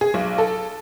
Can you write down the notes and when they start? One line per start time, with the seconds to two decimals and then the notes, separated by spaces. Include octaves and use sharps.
0.01 G#4
0.14 B1
0.38 A4